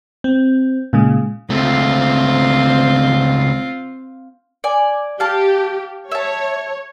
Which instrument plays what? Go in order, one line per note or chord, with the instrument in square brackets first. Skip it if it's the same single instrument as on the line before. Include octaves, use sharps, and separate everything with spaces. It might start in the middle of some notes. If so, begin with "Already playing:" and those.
[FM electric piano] C4
A#2 C#3 G#3
[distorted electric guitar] C#2 A3 [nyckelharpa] C4 F4
[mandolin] D5 G#5
[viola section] G4 [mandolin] F5 A5
[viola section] C#5 [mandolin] E5 A5